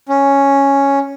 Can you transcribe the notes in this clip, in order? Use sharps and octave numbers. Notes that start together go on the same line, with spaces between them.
C#4